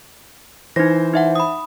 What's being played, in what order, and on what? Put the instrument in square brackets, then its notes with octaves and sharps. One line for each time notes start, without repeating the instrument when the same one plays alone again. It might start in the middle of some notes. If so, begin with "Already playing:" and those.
[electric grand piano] E3 C5 [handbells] D#4 A#6
[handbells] D#4 E5 F#5
B5 D#6